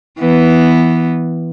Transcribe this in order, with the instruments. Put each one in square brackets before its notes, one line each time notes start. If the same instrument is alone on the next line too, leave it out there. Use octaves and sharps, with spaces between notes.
[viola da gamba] E3 B3